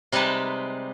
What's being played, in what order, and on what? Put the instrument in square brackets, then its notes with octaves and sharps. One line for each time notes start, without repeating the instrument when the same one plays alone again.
[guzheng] C3 G3 G#3 D#4 B4 A5